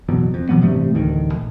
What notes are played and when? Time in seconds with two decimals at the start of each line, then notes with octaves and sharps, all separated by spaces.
0.09 F#1 B1 E2 B2
0.34 F2
0.49 B2 E3 F#3 B3
0.61 A1 G2 C3 A3
0.94 D1 A1 D2 D#3
1.32 A#1